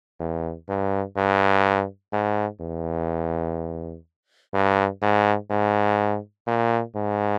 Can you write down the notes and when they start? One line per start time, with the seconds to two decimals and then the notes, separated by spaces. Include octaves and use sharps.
0.20 E2
0.69 G2
1.17 G2
2.13 G#2
2.61 E2
4.54 G2
5.02 G#2
5.50 G#2
6.47 A#2
6.95 G#2